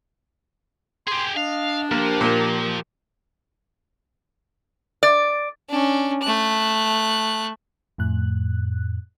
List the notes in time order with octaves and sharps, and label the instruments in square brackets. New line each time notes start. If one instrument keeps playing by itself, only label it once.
[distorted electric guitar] G4 G#4 [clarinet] C6
[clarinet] D4 [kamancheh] D#5 [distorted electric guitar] F5
[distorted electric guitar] F3 [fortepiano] A#3 [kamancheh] G4 A#4
[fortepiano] A#2
[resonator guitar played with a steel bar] D5
[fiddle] C#4 D4
A3 F#6
[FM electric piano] F2 A2 F#6